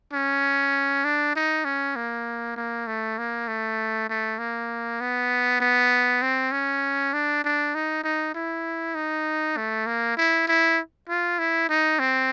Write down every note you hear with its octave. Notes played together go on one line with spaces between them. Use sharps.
C#4
D4
D#4
C#4
A#3
A#3
A3
A#3
A3
A3
A#3
B3
B3
C4
C#4
D4
D4
D#4
D#4
E4
D#4
A3
A#3
E4
E4
F4
E4
D#4
C4